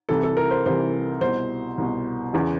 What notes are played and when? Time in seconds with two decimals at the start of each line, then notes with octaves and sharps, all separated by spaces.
0.09 C2 C3 E3 A4
0.23 A4
0.37 A#4
0.51 C5
0.65 C2 C3 E3 C5
1.21 C2 B2 C5
1.78 C2 B2
2.33 E2 C#3 E3